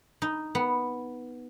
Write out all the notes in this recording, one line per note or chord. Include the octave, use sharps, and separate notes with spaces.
D#4
B3